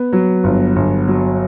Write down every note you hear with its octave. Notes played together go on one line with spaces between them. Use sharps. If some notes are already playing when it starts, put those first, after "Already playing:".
Already playing: B3
F#3
G1
G1
F#3